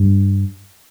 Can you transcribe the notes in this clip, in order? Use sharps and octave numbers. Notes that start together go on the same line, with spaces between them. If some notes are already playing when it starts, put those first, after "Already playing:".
Already playing: G2